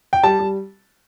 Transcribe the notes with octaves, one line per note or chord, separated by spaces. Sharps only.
G5
G3 A5
G3